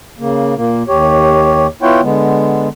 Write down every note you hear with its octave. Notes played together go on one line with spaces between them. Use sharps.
C#3 A#3
A#2 A#3
D#2 G4 C#5
B3 E4 F4 C#5 F#5 G5
D3 G#3 B3